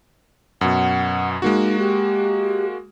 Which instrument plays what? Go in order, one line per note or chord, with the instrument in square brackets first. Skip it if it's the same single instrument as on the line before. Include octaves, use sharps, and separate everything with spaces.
[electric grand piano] F#2 B2 [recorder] F#5
[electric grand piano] G#3 A#3 F#4 [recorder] D#4
[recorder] G4